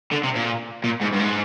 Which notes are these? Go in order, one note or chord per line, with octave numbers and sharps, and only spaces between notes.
D3
C3
A#2
A#2
G#2
G2
G#2